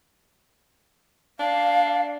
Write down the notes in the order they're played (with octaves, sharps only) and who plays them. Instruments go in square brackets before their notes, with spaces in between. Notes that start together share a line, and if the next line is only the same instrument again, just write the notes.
[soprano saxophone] D4 [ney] F5